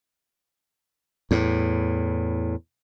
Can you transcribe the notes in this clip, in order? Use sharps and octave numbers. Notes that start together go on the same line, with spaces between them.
E2 A2